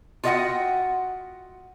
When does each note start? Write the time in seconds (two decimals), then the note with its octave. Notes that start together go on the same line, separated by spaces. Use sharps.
0.24 F4 F#4 D#5 E5 F#5 G5